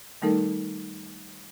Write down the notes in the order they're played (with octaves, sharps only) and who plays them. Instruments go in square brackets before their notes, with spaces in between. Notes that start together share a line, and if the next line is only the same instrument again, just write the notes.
[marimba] D#3 G3 A3 D#4 A4 A#4